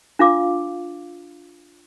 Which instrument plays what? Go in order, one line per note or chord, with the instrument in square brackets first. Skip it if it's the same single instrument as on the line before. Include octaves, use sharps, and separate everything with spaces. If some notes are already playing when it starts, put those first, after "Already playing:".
[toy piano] D4 F4 F5 D6